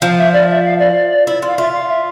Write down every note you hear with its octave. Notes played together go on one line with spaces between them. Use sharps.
F3 F5
E5
D5
E5
F5
D5
E4
F4
F5
F4 E5
F5
E5